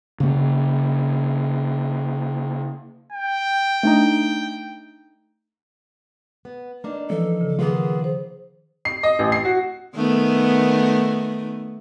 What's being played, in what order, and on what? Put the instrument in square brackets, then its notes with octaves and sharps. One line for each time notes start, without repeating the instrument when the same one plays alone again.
[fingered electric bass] C#3 A#3
[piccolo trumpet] G5
[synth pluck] A3 D4 D#4
[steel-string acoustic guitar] B3
A#3 D4 D#4
[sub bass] E3 [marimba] F3 [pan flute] A4
[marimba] C#3
[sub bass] D#3 [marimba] F3 [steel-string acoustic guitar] A#3 B3 F4 [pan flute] G#4
[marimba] C5
[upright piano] C7
D#5
A1
C7
F#4
[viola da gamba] D#3 A3 B3